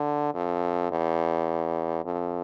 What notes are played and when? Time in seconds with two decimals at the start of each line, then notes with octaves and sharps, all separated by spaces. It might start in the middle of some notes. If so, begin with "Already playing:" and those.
Already playing: D3
0.34 F2
0.91 E2
2.05 F2